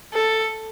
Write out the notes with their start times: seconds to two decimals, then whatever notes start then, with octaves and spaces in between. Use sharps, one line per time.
0.14 A4